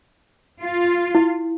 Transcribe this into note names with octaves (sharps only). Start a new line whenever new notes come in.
F4
E4